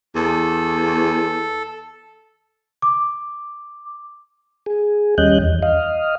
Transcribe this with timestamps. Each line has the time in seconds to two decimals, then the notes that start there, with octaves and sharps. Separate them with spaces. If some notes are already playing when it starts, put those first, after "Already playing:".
0.15 E2 A4
2.82 D6
4.66 G#4
5.18 D#2 G3 C#4 D#5 F#6 G6
5.41 E2
5.62 D#5 F5